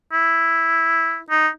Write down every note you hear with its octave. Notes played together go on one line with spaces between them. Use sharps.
E4
D#4